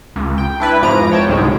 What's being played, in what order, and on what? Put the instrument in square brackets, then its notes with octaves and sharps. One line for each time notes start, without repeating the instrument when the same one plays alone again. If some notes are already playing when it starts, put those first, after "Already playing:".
[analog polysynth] C#2
G5
D4 E4 B4
F2 G#2 E3 F3 A#5 D7
C#5 G5 A5
C2 G#2 D3 F#3 G#3